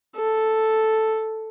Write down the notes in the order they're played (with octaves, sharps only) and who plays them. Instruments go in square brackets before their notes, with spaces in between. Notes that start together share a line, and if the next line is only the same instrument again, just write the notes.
[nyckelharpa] A4